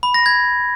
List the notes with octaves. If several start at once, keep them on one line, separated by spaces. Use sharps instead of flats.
B5
A#6
G#6